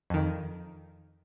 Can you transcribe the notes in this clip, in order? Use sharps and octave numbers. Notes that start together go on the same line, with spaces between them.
F2 D#3